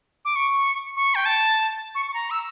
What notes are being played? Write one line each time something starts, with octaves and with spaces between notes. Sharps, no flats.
D6
C#6
C#6
G5
A5
C#6
C#6
A#5
E6